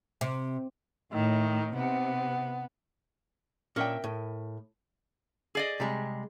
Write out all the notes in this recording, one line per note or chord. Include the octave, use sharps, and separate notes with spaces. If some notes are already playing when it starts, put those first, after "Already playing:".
C3
A2 D#3
C3 B3
A#2 C#4 D4 A#4 E5 G5
A2
G#4 D5 D#5
C3 G3 G#3